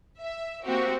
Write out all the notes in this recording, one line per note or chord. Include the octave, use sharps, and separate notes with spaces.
E5
A#3 C4 F#4 G4